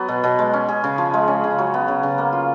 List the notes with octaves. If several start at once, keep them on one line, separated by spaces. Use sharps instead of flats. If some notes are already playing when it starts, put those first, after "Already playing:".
Already playing: F#3 B3
B2
B2
G#3
C#4
G#4
C#3
F3
G#3
C#4
C#3
F#3
B3
C#3
C#3
A#3
F4